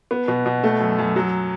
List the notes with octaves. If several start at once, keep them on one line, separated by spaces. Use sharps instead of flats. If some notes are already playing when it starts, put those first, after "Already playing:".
B3
B2
B2
A3
F#2
F#2
F#3